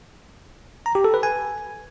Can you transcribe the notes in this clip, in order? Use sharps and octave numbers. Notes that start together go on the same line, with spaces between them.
A#5
G4
A4
B4
G#5